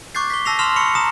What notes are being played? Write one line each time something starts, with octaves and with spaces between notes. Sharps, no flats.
C#6 D6 F#6 G6 A6 C7
B6 G7
A5 E6 A#6 C7 F7
A5 C6 E6 F6 E7 F7
B5 C#6 E6 C#7
A#5 D#6 E7